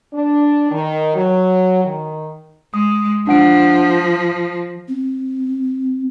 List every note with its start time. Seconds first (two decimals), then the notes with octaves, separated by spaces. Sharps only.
0.13 D4
0.71 D#3
1.14 F#3
1.85 D#3
2.74 G#3 D#6
3.27 F3 D4 F#5 D7
3.95 A#6
4.88 C4